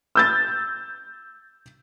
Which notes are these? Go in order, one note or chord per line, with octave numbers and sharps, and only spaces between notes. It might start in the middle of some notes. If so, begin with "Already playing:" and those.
E6 G6 A6